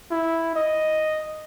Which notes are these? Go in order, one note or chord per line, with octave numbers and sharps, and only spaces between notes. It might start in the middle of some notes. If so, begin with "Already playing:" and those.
E4
D#5